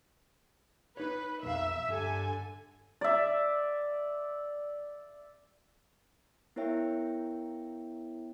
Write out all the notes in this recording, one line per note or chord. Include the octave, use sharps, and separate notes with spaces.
D#4 B4 C#5
B1 F2 E5 F5
G2 D3 A4 G#5
D5 E5
B3 E4 A#4 C#5 E5 G5